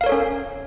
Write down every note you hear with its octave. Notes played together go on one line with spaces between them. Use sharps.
C#4 A4 A#4 C#5 F5